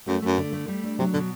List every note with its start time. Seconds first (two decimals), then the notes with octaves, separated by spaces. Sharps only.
0.07 F#2 A3
0.22 F#2 A3
0.38 D3
0.53 A3
0.68 G3
0.83 D4
0.99 C3 F#3
1.13 B2 D3